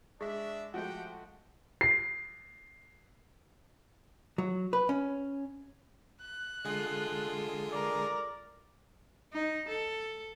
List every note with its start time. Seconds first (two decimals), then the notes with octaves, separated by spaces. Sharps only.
0.21 G#3 D4 D5 E5 C#6 B6
0.74 F3 G#3 A3 F#4 G4 F#5 G5
1.81 C7
4.38 F#3
4.73 B4
4.89 C#4
6.21 F#6
6.65 D3 G#3 F4 G#4 A4
7.73 A#4 D5
9.33 D#4
9.69 A4